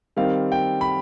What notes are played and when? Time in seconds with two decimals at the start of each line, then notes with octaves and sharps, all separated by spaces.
0.16 D#3 G3 C4 F5
0.52 G5
0.81 B5